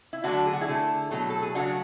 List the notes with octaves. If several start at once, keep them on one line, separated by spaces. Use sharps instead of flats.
E4
D3 F#3 A3 D4 F#4
G#4
F#4
E4 G#4
D3 A3
B2 F#3 A3
A4
G#4
C#3 F#3 A3 D4 F#4